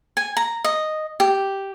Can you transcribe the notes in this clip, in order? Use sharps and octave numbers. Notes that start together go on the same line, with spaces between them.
G#5
A#5
D#5
G4